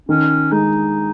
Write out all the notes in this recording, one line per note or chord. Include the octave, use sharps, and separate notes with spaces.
D#3 C#4
G#3 D#4